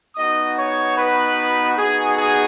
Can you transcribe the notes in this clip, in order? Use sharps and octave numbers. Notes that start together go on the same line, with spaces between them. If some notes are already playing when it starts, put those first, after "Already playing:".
B3 D#4 F#4 D#5 D#6
C#5 C#6
B4 B5
B3 D#4 F#4 G#4
G#4